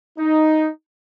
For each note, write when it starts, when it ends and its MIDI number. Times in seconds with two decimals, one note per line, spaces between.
0.18 0.69 63